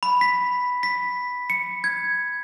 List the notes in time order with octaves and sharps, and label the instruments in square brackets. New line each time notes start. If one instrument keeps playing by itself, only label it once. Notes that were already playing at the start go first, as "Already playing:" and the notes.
[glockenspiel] B5
B6
B6
C#7
G#6